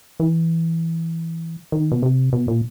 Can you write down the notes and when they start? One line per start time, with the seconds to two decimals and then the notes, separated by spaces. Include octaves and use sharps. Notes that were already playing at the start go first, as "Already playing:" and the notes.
0.20 E3
1.72 D#3
1.92 B2
2.02 C3
2.33 B2
2.48 A#2